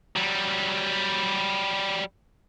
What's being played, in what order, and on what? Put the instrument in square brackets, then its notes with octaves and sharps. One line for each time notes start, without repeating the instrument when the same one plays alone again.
[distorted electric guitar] F#3 G3